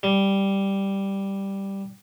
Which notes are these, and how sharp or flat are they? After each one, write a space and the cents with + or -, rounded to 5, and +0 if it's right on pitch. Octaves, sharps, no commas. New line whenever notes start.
G3 +0